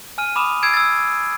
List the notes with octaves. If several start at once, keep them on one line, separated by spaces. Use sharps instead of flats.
G#5 F6 D#7
B5 D6 D#6 E7
E6 G#6 C7 D7 E7
E6 A6